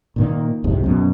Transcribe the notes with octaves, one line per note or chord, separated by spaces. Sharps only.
A#2 D#3 A#3
C2 F2 G#2 C3
F#2 B2 B3